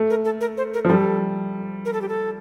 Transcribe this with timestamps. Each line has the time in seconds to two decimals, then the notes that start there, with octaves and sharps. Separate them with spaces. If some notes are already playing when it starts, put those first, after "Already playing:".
Already playing: A3
0.10 A#4
0.25 A4
0.41 A#4
0.57 C5
0.74 A#4
0.85 F3
0.89 G3 A4
1.85 A#4
1.93 A4
2.01 G4
2.08 A4